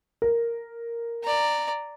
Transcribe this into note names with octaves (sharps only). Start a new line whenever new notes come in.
A#4
D5 A#5